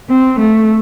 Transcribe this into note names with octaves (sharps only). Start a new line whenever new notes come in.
C4
A3